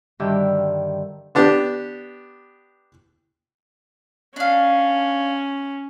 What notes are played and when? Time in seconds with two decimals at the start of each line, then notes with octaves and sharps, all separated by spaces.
0.20 G2 D3 D#3 G4 E5 E6
1.35 B3 D4 G4
4.36 C#4 D4 F5